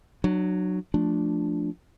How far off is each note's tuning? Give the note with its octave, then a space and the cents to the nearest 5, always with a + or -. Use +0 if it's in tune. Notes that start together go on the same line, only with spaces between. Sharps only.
F#3 +0 D4 +40
F3 +0 A3 +0 D4 +0